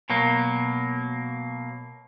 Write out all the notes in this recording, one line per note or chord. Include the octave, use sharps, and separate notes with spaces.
B2 F#3 A#3